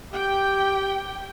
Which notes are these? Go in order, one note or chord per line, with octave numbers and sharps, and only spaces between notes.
G4 G5